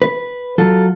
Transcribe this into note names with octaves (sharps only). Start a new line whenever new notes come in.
B4
F#3 F4 A4